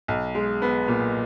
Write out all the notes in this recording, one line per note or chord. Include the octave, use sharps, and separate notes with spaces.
B1
G#3
B3
A#2